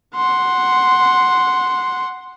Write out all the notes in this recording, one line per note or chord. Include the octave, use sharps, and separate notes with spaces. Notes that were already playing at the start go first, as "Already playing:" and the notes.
F#5 C6